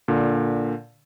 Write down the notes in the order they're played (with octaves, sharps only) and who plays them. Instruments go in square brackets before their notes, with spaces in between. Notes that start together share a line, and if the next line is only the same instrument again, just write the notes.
[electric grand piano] A#2 D3